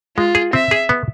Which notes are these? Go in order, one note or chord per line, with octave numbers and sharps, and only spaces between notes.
G#3 F4
G#4
C4 E5
G#4
B3